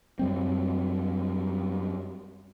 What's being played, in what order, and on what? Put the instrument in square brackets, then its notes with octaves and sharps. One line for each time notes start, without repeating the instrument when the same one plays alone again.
[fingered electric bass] F#2 G3 C4